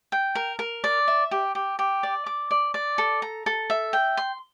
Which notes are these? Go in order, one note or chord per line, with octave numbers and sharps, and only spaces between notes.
G5
A#4
A#4
D5
E5
G4
G4
G4
D5
D6
D5
D5
A4
A#5
A4
E5
G5
C6